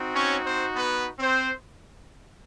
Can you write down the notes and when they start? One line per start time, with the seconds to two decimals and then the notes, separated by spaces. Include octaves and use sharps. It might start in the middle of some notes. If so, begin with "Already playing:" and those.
Already playing: C4 D#4 F#4
0.15 C#4 C#5
0.45 C4 C5
0.75 B3 B4
1.19 C4 C5